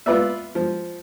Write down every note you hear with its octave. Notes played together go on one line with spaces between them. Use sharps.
B3 F4 B4 D5 E5
F3